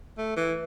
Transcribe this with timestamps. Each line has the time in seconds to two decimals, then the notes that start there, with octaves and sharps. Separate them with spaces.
0.18 A3
0.36 E3